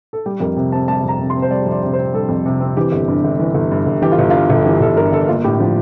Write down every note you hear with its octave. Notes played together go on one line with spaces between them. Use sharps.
A4
G3 G4
F2 A#4
C3
C4 A5
G3 A5
F2 A#5
C3
C6
C4
C5
G3 D5
F2
D5
C3
C5
C4
G3 A4
F2
C3
C4
E3 G4
G1
G2
G1
E3
G1
G2
G1
E3 G4
F4
G1
G2 F4
G1
E3 G4
G1 A4
G2 A#4
G1 A4
A#3 F4
A2 G4
F3